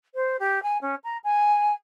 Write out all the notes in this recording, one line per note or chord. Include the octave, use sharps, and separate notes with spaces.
C5
G4
G#5
C#4
A#5
G#5